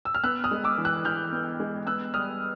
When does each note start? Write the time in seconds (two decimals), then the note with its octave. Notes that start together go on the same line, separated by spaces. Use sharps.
0.05 E6
0.15 F6
0.24 B3 E6 F#6
0.44 D#6 F6
0.51 G#3
0.64 D6 E6
0.78 E3
0.85 E6 F#6
1.05 E3 F6 G6
1.32 B3
1.60 G#3
1.87 B3 E6 F#6
2.14 G3 D#6 F6